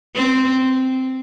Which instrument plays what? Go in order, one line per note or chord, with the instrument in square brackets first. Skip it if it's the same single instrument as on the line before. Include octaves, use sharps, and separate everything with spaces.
[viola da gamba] C4